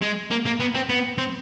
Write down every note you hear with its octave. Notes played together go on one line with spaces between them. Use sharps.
G#3
A#3
A#3
B3
C4
B3
C4